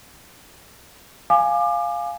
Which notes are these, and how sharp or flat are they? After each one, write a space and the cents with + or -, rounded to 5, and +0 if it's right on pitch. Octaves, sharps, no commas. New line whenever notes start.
F5 +0 G#5 +0 D6 +30